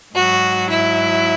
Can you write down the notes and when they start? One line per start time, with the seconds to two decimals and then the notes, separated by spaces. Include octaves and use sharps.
0.14 G#2 F#3 F#4
0.69 E4